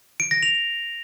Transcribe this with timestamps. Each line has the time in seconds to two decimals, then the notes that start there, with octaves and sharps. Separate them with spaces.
0.20 D7
0.31 A#6
0.43 F7